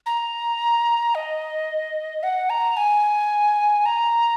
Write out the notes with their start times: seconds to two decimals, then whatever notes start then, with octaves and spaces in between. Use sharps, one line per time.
0.06 A#5
1.15 D#5
2.23 F#5
2.50 A#5
2.77 G#5
3.86 A#5